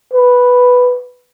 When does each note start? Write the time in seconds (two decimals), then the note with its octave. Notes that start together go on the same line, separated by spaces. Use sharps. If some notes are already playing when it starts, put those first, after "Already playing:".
0.13 B4